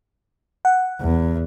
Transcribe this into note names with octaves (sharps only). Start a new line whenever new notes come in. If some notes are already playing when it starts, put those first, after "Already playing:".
F#5
E2